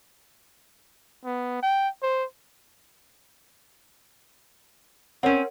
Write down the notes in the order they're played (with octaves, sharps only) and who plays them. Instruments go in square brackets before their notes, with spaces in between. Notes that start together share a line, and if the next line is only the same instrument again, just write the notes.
[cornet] B3
G5
C5
[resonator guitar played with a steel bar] C4 C#4 [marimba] A#4 C#5 F#5